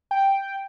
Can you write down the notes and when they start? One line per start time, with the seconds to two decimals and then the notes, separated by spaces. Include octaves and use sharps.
0.11 G5